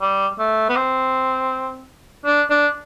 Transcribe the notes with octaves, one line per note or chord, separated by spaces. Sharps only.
G3
A3
B3
C4
D4
D4